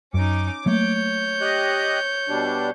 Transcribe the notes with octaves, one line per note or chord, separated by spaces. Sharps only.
F#2 C#4 D#4 D6
F#3 A3 A#3 C#5 G6
G4 D#5 F#6
B2 G3 D4